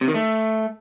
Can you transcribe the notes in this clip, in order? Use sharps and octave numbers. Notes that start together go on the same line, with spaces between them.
C3
D#3
A3